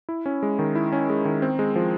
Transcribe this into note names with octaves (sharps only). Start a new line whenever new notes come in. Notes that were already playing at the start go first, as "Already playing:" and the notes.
E4
C#4
G#3
D#3
E4
C#4
G#3
D#3
C4
G#3
F3